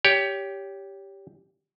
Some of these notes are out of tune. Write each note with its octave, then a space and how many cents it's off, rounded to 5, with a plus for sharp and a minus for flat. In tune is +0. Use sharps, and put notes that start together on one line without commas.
G4 +0 C#5 +25